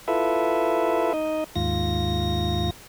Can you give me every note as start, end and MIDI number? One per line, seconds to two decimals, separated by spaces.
0.08 1.13 64
0.08 1.13 65
0.08 1.13 69
0.08 1.13 71
0.08 1.13 76
1.14 1.44 63
1.14 1.44 75
1.56 2.70 39
1.56 2.70 44
1.56 2.70 65
1.56 2.70 94